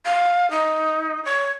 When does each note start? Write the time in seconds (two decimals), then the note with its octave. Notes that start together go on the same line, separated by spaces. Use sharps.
0.06 F5
0.51 D#4
1.25 C#5